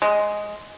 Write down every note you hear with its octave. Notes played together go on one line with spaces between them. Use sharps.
G#3